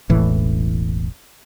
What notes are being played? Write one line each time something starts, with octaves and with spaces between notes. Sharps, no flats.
E1 A1 A2 E3